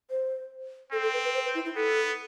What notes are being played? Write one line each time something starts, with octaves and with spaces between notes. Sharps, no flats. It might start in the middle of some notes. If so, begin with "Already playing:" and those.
C5
C4 A4
A4
B4
B4
C5
B4
E4
E4
B3 A4